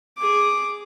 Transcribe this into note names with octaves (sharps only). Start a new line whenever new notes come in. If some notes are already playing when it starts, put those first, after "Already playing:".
G#4 D6